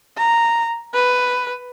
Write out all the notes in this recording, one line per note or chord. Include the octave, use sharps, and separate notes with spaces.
A#5
B4